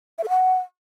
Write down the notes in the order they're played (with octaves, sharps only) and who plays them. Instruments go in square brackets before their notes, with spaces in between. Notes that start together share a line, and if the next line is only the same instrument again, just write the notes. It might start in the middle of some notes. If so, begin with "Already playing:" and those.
[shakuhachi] E5
A4
F#5